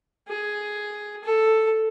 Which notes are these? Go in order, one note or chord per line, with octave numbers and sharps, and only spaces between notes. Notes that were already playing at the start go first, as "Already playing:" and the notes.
G#4
A4